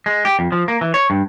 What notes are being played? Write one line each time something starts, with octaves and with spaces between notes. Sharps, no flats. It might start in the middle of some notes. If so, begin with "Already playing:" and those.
G#3
G4
F2
F3
A#3
E3
C#5
G2